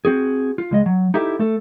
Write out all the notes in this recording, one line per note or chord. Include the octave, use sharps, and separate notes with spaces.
C4 F#4 G#4
F4
C#2 G#3 D#5
F#3
D#4 E4 G4 A4
A3 A4